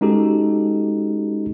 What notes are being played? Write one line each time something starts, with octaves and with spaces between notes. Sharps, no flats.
G#3 C#4 D#4 F#4 G4 A4